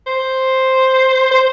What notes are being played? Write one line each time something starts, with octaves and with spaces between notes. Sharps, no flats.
C5
C5